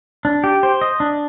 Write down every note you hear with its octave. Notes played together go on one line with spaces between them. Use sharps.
D4
G4
C5
D#5
D4